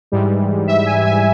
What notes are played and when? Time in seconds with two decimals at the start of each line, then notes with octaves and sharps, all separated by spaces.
0.12 G#2 E3 G3
0.67 E5
0.86 G#5
1.05 G#5